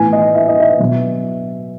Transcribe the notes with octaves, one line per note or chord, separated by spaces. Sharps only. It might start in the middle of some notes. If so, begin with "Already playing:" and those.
Already playing: A2 E3 B3 E4 G#5
D#5
E5
D#5
E5
B2 F#3 B3